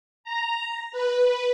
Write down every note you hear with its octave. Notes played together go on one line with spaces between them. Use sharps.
A#5
B4